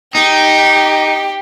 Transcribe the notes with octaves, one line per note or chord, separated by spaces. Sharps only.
D#4 G4